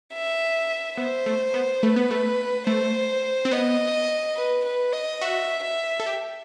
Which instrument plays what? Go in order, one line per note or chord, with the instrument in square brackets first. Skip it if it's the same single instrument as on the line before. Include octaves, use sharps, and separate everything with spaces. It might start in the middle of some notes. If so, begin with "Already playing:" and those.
[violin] E5
[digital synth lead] B3 [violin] C5
[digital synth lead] A3
B3
[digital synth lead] A3 [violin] B4
[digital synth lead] B3
A3
[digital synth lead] A3 [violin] C5
[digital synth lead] C4
[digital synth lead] B3 [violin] D#5
[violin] B4
B4
D#5
[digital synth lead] F#4 [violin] E5
[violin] E5
[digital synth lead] A4
G4